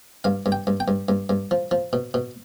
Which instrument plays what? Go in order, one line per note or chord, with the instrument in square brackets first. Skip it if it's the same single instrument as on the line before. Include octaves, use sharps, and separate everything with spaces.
[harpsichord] G2 F5
G2
G5
G2
G5
G2
G2
G2
F3
F3
B2
B2